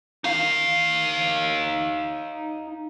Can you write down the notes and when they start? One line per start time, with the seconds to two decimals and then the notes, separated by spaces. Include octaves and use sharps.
0.24 D#4 F5